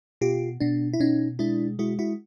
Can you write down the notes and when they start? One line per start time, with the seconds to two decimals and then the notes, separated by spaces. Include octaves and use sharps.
0.21 B2 F4 G4
0.61 B2 D4
0.93 E4
1.00 B2 C#4 D#4
1.39 G#3 D4 E4
1.79 G#3 E4 F#4
1.99 E4 F#4